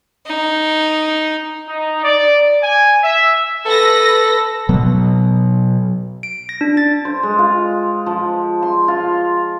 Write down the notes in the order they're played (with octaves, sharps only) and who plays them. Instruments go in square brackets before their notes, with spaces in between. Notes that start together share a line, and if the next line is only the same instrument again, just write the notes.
[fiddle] D#4
[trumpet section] D#4
D5
G#5
E5
[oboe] A4 [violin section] B4 A#6
[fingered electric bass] B2 F#3 B3
[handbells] D7
A#6
D4
A6
[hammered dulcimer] C5
G#3
F4
F3
C6
F4